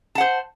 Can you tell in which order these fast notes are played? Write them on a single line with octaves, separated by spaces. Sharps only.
A5 F#5 C5